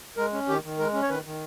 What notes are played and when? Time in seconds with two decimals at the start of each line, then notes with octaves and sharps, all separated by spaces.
0.17 G#3 A#4
0.33 C#4
0.48 D#3 G4
0.64 D#3
0.79 G#3 A#4
0.93 C#4
1.02 C#5
1.09 D#3 B4
1.24 D#3